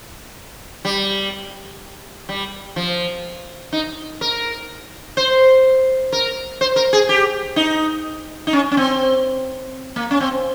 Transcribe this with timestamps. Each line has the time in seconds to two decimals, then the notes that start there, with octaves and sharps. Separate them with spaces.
0.85 G3
2.29 G3
2.76 F3
3.72 D#4
4.21 A#4
5.17 C5
6.12 A#4
6.61 C5
6.76 A#4
6.93 G#4
7.09 G4
7.56 D#4
8.47 D#4
8.53 C#4
8.71 C#4
8.77 C4
9.96 A#3
10.11 C#4
10.20 C4